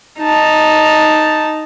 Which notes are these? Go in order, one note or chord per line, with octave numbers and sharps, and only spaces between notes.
D#4 A5